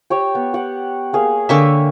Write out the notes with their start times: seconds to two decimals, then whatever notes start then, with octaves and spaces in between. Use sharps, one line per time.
0.10 G4 C#5 G5
0.35 B3
0.54 G4 F#5
1.13 A#3 G#4 F5
1.49 D3 A#3 C#5 E5 G5 G#5